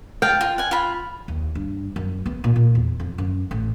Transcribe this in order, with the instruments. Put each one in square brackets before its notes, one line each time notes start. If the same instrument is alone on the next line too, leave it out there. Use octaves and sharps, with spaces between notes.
[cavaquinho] F5 A5 [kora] G5
[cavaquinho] F4
F#5 G#5
F4 B5
[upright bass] D#2
G2
F#2
B3
A#2
A#2
E2
F2
F#2
A1